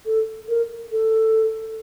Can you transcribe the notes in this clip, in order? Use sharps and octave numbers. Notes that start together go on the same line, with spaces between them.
A4
A#4
A4